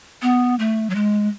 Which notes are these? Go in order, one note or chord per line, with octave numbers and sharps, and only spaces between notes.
B3
A3
F#3
G#3